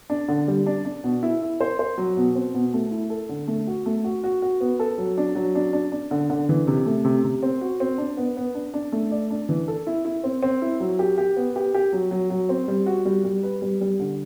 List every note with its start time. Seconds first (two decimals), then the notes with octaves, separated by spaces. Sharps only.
0.10 D4
0.28 D3
0.48 G3
0.66 D4
0.85 D4
1.04 B2
1.23 E4
1.42 E4
1.61 C5
1.79 C5
1.98 F#3
2.17 B2
2.36 C4
2.54 B2
2.74 A3
2.91 E4
3.10 A4
3.29 D3
3.48 A3
3.67 F#4
3.86 A3
4.04 F#4
4.24 F#4
4.42 F#4
4.61 B3
4.79 A4
4.98 F#3
5.18 D4
5.35 F#3
5.55 D4
5.73 D4
5.92 D4
6.11 D3
6.30 D3
6.49 E3
6.67 C3
6.86 A3
7.05 C3
7.24 C3
7.43 C4
7.61 F#4
7.80 C4
7.98 D4
8.17 B3
8.37 B3
8.55 D4
8.74 D4
8.92 A3
9.11 D5
9.30 D4
9.49 E3
9.68 A4
9.87 E4
10.05 E4
10.24 C4
10.43 C4
10.62 E4
10.80 F#3
10.99 G4
11.18 G4
11.36 B3
11.56 G4
11.74 G4
11.93 F#3
12.11 F#3
12.30 F#3
12.49 C4
12.68 G3
12.86 F#4
13.05 G3
13.24 G3
13.43 B4
13.62 G3
13.81 G3
14.00 D3